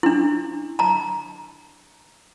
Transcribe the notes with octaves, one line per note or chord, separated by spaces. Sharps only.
D4 E4
A5 A#5